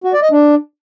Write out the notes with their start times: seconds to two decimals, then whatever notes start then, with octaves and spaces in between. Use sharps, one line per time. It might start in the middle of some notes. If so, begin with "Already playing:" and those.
0.04 F#4
0.13 D5
0.22 D#5
0.31 D4